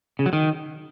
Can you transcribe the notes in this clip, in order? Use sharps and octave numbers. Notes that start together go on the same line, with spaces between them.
C#3
F#3
D#3